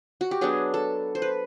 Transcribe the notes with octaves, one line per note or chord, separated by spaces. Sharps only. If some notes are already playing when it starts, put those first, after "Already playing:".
F#4
G4
F#3 B3 D4 G#4
A4
C5
B4